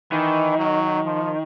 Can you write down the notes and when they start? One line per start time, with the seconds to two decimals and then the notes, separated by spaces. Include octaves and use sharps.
0.11 D#3 E3
0.58 F#3
1.05 F3